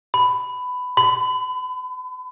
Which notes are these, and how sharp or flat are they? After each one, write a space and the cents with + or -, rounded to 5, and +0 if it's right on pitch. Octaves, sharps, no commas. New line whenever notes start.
B5 +15
B5 +40